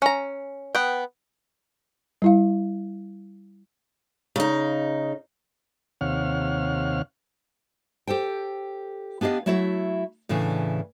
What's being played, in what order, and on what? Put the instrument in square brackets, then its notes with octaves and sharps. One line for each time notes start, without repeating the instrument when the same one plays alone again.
[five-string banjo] C#4 A#5
B3 G5
[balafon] G3 E4 F5
[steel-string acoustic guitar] C#3 D#4
[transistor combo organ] D#2 C3 C#5 F5 F#5 F6
[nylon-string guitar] G4 A4 C5 G5
B3 D4 G4 D#5 F5
F#3 A3 E4 F#4 C#5 E5
A2 C#3 E3 D4